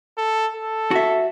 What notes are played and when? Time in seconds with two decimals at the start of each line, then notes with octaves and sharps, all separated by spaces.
0.18 A4
0.55 A4
0.91 F#4 E5